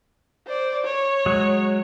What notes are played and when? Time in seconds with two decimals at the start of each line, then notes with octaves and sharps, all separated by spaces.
0.47 C5 D5
0.84 C#5
1.26 F#3 G#3